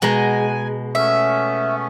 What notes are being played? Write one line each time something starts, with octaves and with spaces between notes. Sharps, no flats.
B2 G#3 F#5 G#5 A#5
A3 B3 C#4 E5